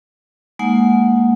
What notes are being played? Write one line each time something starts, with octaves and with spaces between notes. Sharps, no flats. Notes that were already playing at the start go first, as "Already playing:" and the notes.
G#3 A#3 D#4 F#5 G#5